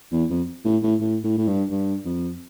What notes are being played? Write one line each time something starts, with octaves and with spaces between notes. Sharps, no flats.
E2
F2
A2
A2
A2
A2
A2
G2
G2
F2